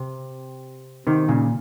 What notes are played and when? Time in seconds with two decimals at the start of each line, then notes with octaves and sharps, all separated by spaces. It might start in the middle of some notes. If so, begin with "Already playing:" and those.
Already playing: C3
1.07 C3 D#3
1.28 A#2 C#3